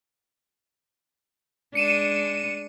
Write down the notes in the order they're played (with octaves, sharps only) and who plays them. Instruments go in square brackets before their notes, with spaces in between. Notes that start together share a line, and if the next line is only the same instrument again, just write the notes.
[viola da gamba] G#3 D4 [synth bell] C#7 D#7 E7